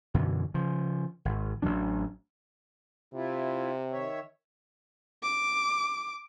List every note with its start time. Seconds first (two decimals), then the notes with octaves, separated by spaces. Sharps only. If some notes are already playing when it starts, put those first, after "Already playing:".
0.14 F#2 B2 D3 E3
0.54 C#3 F3
1.25 G#1
1.62 A1 D3 F#3 D4
3.14 C3 E4 F4
3.92 D#3 C#5 E5
5.23 D6